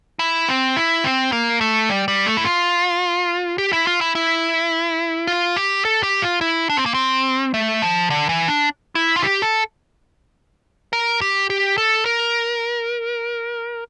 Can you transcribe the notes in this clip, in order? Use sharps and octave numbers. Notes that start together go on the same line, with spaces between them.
E4
C4
E4
C4
A#3
A3
G3
G3
A3
E4
F4
G4
E4
F4
E4
E4
F4
G4
A4
G4
F4
E4
D4
C4
A#3
C4
A3
F3
D3
E3
D4
E4
F4
G4
A4
A#4
G4
G4
A4
A#4